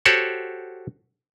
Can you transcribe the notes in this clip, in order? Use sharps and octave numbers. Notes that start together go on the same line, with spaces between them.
F#4 G4 A4 C5 C#5 F#5